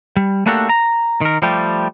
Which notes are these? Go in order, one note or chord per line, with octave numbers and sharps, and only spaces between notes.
G3
A3 A#3 D4 F#4 G4 A4
A#5
D#3 A#4
F3 G3 A3 G4